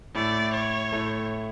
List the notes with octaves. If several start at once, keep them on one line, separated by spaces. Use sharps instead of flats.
A2 A3 D5
C#5
A2 A3